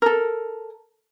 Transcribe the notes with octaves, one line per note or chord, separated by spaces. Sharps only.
A4 A#4